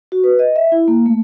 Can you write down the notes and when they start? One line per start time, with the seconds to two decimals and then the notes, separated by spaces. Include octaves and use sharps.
0.12 F#4
0.24 B4
0.39 D#5
0.56 E5
0.72 E4
0.88 A#3
1.06 A3